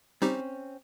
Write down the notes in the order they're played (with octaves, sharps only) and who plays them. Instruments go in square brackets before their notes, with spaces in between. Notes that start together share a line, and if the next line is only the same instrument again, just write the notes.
[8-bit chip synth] G3 D#4 G4 [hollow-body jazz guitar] C4 C#4